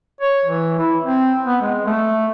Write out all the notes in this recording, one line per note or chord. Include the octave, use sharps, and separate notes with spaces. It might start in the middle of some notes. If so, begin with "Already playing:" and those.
C#5
E3
E4
C4
B3
G#3
A3